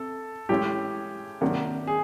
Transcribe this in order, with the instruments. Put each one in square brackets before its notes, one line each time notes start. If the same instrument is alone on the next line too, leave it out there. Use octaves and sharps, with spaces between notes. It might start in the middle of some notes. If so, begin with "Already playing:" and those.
Already playing: [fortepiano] C3 [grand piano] A4
[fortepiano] A2 E3 G#3 C#4 [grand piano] G4
[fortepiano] C3 D#3 F#3 A#3 D4
[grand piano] G#4